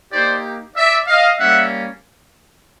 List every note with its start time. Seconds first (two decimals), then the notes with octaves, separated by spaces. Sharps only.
0.12 A#3 D#4 G4 C5 D5
0.76 D5 E5
1.07 D#5 F5
1.39 G3 A#3 C#4 E5 F#5